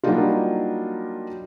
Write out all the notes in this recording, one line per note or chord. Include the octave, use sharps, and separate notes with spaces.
F#3 G3 A#3 D4 D#4 F4